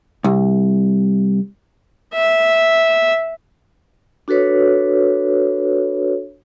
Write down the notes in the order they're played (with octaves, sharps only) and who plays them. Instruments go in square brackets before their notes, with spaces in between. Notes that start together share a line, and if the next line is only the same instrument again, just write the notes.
[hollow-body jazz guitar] C2
[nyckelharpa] E5
[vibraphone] D4 F#4 A4 B4 C#5